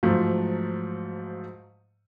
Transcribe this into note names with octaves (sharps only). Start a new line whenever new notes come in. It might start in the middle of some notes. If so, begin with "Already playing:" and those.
G#2 F3 F#3 A3